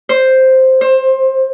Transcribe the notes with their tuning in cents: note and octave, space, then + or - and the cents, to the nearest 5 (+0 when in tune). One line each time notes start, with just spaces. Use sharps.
C5 +0
C5 +20